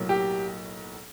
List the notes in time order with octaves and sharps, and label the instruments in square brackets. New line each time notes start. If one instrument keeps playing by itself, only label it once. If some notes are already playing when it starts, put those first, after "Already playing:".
Already playing: [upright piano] B1 A2 F#3 A#3
G4